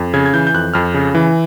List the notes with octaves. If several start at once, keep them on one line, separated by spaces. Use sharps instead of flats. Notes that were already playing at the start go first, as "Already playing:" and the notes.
Already playing: F2
C#3 G#6
G#6
E3 G6
G6
F2 F#6
F2 F6
C#3
E3